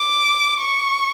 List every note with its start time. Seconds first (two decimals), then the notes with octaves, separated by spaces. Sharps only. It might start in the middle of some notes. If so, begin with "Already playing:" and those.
Already playing: D6
0.61 C#6